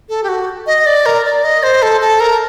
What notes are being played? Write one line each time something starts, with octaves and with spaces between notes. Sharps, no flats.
A4
G4
F#4
D#5
D5
A#4
D5
D#5
C5
A4
A4
A#4